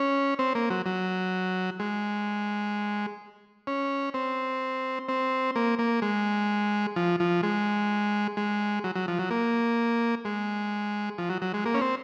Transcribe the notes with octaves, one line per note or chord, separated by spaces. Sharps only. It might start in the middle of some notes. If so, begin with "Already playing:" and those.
Already playing: C#4
C4
A#3
F#3
F#3
G#3
C#4
C4
C4
A#3
A#3
G#3
F3
F3
G#3
G#3
F#3
F#3
F3
F#3
A#3
G#3
F3
F#3
F#3
G#3
A#3
C#4
C4